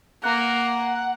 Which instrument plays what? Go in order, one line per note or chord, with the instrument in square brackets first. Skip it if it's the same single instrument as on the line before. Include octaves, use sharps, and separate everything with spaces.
[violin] A#3 [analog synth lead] F#5